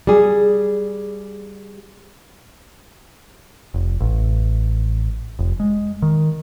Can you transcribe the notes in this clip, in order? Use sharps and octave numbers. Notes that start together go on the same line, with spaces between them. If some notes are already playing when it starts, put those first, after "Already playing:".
G3 G#4
F1
A1
F1
G#3
D#3